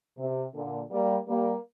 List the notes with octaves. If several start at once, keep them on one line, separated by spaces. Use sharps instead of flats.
C3
A#2 D3
G3 A#3
G3 A#3